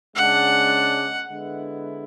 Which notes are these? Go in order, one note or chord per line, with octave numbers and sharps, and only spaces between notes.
C#3 G#3 D4 F#5
D3 G#3 B3 E4